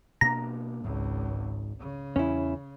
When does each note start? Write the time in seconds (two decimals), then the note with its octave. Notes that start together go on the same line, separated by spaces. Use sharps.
0.21 B2 A#3 D4 A#5
0.84 G#1 C#2 G#2
1.80 C#3
2.16 E2 C#4 E4